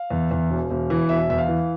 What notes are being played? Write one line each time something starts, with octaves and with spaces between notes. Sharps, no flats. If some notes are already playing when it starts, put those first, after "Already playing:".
Already playing: F5
E2
E2
E1
E1
E3
E1 E5
E2 E5
F5
E3